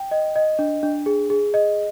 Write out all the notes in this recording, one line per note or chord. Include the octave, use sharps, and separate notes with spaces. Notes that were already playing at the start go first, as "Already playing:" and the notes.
Already playing: G5
D#5
D#5
D4
D4
G#4
G#4
D#5